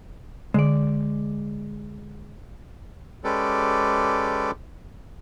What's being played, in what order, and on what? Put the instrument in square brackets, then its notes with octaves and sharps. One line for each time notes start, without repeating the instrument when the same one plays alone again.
[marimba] D3 [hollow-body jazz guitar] G#3 D5
[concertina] G#3 C#4 G4 A4 B4 D5